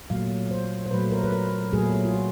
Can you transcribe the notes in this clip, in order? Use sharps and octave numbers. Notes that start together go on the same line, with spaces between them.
A#2 F#3 A3 F5
C5
C5
A#2 F#3 A3 B4
A#4
B4
A#4
A#2 F#3 A3 G#4
F4
F#4